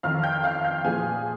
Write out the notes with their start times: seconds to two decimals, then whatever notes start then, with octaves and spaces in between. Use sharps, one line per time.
0.03 F2 D#3 F5 F6
0.23 G5 G6
0.44 F5 F6
0.64 G5 G6
0.85 A#2 F3 G#4 G#5